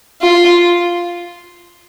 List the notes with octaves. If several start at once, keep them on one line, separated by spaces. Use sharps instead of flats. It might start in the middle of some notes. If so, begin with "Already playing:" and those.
F4